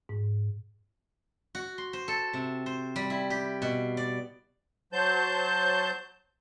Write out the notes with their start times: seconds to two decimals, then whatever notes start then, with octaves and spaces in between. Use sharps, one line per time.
0.09 G#2
1.55 F#4
1.78 C6
1.93 C5
2.08 A4
2.33 C3
2.66 C5
2.96 G3
3.10 E4
3.30 G4
3.62 B2
3.97 D5
4.93 F#3 C5 A5 G6